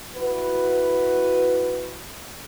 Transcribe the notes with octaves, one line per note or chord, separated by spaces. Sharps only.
E4 F#4 B4